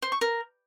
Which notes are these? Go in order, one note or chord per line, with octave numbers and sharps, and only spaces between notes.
C5
C#6
A#4